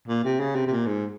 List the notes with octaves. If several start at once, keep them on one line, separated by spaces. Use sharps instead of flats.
A#2
C3
C#3
C3
C3
A#2
G#2